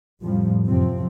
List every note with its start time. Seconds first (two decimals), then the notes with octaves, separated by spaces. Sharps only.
0.21 F2 A2 F3 G3
0.67 F#2 C3 F3 C4